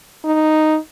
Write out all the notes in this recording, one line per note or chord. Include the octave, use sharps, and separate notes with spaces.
D#4